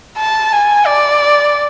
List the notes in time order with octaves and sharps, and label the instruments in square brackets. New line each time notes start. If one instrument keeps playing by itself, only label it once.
[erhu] A5
G#5
D5